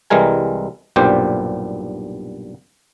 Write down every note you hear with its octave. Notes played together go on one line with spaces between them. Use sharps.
C2 E3 G3 G#3 A#4 G#5
B1 G2 A#2 G3 G4 C5